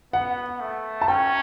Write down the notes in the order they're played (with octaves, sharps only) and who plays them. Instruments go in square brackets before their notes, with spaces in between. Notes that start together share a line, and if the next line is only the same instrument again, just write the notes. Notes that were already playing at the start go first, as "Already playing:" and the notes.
[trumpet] B3 [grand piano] F#5
[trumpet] A3
[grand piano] A5
[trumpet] C#4 [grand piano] G5